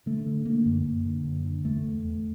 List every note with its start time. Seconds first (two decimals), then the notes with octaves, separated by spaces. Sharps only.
0.06 D3 A3
0.27 D3
0.45 D3 A#3
0.66 F#2
0.86 F#2
1.05 D3
1.25 F#2
1.45 D3
1.65 E2 A3
1.85 E2
2.05 E2